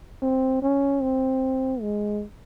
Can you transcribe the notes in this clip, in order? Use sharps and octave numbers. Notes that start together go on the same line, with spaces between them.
C4
C#4
C4
G#3